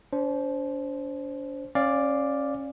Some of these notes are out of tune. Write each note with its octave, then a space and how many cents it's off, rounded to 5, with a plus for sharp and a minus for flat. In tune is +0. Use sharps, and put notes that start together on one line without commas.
D4 -40 C5 +0
C#4 -25 D5 +0 F5 +0